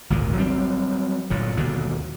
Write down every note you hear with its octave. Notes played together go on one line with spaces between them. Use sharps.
G#1 D2 A#2 D#3
F#3 G3 B3 C4
G1 A#2 F#3
D#2 B2 D3